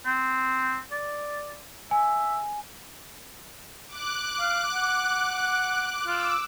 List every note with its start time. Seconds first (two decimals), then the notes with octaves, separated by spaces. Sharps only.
0.05 C4
0.91 D5
1.91 E5 G#5
3.88 D6 F#6
4.40 F5
4.74 F#5
6.07 F4 D6 E6